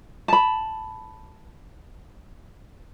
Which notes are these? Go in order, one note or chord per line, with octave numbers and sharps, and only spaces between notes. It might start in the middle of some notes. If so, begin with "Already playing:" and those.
A5 B5